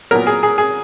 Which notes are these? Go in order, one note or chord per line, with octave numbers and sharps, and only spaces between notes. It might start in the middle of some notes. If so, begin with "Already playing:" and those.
A#2 F#3 B3 A#4
G#4
G#4
G#4